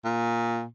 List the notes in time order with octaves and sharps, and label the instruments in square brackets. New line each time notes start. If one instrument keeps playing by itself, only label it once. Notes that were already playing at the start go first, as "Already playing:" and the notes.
[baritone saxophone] A#2